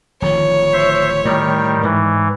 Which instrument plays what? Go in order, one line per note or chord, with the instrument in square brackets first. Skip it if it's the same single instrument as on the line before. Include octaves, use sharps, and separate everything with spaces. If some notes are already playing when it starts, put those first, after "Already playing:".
[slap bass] D1 D#3 F3 [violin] C#5
[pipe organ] C5 E5
[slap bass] A2 [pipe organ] D#3 G3
[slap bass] G#2 [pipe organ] E3